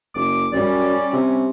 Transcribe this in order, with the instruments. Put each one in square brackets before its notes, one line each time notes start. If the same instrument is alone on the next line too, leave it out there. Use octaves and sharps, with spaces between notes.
[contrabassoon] F#1 [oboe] D6
[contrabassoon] F#2 [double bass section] G3 C#4 [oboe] D5
[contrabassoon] C3